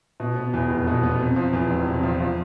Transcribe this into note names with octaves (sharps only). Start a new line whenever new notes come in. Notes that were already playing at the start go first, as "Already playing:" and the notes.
B2
B3
E2
F1
B2
B3
C3
F3
E2
E1
C3
F3
F3